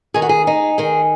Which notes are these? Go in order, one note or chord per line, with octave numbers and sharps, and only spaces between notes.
D#3 G#4
F#4
G#4
D#4 G#4
D#3 G#4